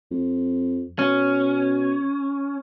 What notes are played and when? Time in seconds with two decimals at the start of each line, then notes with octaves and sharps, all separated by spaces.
0.11 F2
0.99 B2 C#4